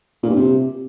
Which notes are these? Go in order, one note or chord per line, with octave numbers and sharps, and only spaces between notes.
A#2
G2
C3